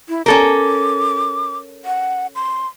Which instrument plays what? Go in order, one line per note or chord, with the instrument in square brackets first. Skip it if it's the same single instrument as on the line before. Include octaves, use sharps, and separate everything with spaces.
[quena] E4
[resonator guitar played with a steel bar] C#4 A4 A#4 [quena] D6
[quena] F#5
C6